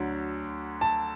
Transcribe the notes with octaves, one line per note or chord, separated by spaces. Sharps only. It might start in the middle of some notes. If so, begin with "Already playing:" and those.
Already playing: D2 D3 F#3
A5